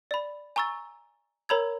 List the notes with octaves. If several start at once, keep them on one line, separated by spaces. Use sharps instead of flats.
D5 B5
G#5 A#5 C#6 E6 A6
A#4 C#5 A#5 B5 E6 G#6